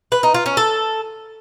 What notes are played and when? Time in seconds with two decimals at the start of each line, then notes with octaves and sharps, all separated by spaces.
0.12 B4
0.23 D#4
0.34 F4
0.46 C#4
0.57 A4